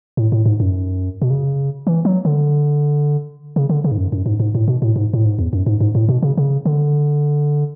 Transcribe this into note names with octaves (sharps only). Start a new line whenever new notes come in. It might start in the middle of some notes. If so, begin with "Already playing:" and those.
A2
A2
G#2
F#2
B2
C#3
E3
F#3
D3
C#3
D3
C#3
G#2
F#2
F#2
G#2
G#2
A2
B2
A2
G#2
A2
G#2
E2
F#2
G#2
G#2
A2
B2
C#3
C#3
D3